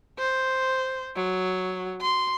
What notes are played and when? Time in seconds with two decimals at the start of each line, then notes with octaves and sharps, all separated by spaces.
0.19 C5
1.16 F#3
2.02 C6